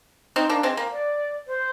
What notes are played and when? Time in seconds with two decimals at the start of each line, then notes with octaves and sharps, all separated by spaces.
0.36 C4 D#4
0.49 A#3 D4
0.63 G#3 C4
0.77 A#3
0.92 D5
1.48 C5